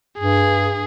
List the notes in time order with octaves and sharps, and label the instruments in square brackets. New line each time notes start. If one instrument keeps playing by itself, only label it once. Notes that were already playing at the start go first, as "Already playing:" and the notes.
[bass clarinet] G2 [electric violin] G#4